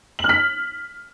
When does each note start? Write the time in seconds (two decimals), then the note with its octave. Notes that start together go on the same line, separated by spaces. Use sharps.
0.19 F#7
0.24 F6
0.29 B6